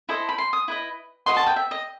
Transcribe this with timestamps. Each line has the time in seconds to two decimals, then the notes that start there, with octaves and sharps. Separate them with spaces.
0.09 E4 A4 C5 D#5
0.29 B5
0.38 C6
0.53 D#6
0.68 E4 B4 D#5
1.26 F#4 B4 D#5 C6
1.37 A5
1.47 G5
1.56 E5
1.71 D#5